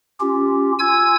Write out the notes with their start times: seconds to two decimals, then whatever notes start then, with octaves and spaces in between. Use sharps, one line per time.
0.21 C#4 F4 G4
0.79 F4 G#5 E6 G#6